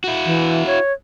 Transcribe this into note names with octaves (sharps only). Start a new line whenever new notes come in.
E4 F#4
E3
C#5